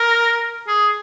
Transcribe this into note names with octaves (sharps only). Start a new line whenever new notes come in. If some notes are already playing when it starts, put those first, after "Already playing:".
Already playing: A#4
G#4